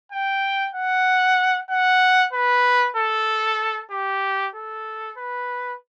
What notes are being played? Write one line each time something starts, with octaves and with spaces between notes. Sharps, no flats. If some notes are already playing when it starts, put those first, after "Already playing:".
G5
F#5
F#5
B4
A4
G4
A4
B4